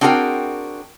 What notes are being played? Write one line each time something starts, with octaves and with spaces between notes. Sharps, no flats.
C4 D4 F#4 G#4 A#4 G5